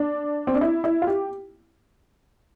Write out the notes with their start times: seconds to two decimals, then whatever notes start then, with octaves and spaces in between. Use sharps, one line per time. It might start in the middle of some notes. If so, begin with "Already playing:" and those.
Already playing: D4
0.47 C4
0.54 D4
0.61 E4
0.84 E4
1.02 F4
1.07 G4